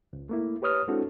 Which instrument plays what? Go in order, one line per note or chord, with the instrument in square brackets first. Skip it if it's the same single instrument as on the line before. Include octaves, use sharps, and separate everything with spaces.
[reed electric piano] C#2
A3 A#3 E4
G4 B4 C#5 D#6 F6
G#3 C4 D4 E4 F#4 A4